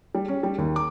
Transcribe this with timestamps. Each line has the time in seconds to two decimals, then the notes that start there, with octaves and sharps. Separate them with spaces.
0.15 G3
0.28 C#4
0.43 G3
0.58 D#2
0.76 D6